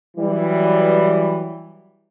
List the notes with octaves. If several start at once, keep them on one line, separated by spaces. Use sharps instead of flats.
E3 F#3 G3